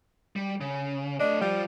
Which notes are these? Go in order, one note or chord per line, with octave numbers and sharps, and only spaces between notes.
G3
C#3
A3 D4 D#5
F3 G3 F4